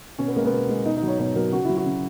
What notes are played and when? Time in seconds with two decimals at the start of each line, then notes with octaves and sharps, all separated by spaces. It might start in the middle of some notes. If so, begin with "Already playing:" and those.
0.19 B2 C#4
0.28 B3
0.36 G#3 A#3
0.45 B3
0.52 B2
0.69 G#3
0.85 B2 D#4
0.97 D#4
1.03 F#3 C#5
1.19 B2 C#5
1.35 F#3 A#4
1.52 C#3 F#4
1.65 F#3 E4
1.77 F#4
1.86 C#3